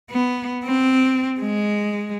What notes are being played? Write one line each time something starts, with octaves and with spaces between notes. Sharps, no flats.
B3
C4
G#3